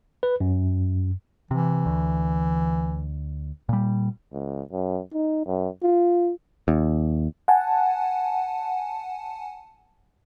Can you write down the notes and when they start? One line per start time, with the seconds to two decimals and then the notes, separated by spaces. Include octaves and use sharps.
0.23 B4
0.40 F#2
1.51 C3 E3
1.86 D2
3.69 A#2 G3
4.32 C#2
4.72 F#2
5.13 D#4
5.46 F#2
5.83 F4
6.68 D#2
7.48 F#5 G#5 A5